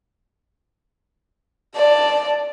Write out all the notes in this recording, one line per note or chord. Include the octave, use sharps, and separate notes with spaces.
D5 A5